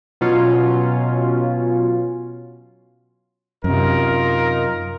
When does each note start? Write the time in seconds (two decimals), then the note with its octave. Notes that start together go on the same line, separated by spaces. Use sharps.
0.21 B2 F#3 C#4 F4
3.64 F#2 C3 D#4 F4 A#4